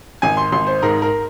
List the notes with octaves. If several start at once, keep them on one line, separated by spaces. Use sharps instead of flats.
G#1 G#5
C6
G#1 C6
C5
G#2 A#4
A#4